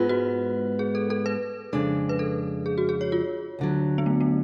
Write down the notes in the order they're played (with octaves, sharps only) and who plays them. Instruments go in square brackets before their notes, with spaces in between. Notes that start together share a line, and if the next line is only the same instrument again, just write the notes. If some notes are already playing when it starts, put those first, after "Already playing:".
Already playing: [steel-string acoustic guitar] G#2 G#3 B3 [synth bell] F4
[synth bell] F#4
G#4
A4
A4
B4
[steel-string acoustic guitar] F2 C#3 G#3 D4 [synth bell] A4
[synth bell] B4
A4
G#4
F#4
G#4
C#5
F4
[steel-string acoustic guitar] D2 D3 F#3
[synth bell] B3
A3
A3